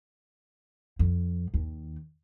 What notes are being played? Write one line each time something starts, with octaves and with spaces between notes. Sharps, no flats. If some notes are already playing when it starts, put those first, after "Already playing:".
F2
D#2